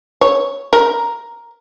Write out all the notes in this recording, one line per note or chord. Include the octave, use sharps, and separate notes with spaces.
C#5
A#4